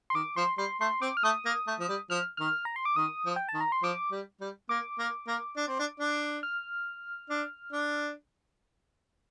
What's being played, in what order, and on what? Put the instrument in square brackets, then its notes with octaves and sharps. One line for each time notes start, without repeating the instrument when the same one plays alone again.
[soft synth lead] C6
[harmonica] D#3 [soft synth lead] D6
[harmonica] F3 [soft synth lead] C6
[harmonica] G3 [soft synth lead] C6
[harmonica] A3 [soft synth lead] C6
[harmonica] C4 [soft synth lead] D6
[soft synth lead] F6
[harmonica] A3 [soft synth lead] D#6
[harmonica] A#3
A3
F3
G3
[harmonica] F3 [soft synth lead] F6
[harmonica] D#3 [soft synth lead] F6
[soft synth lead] A#5
C6
D6
[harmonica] D#3 [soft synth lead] D#6
[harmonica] F3
[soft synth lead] G5
A5
[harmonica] D#3
[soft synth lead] A#5
C6
[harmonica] F3 [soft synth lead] D6
[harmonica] G3
G3
[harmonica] A#3 [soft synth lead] D6
[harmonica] A#3
A#3
D4
C4
D4
D4
[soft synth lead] F6
[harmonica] D4
D4